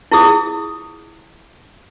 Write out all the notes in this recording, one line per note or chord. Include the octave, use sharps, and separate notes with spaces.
E4 F4 G#4 D#6